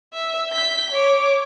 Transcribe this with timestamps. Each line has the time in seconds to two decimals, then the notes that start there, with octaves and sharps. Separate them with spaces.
0.13 E5
0.50 G6 B6
0.91 C#5 D6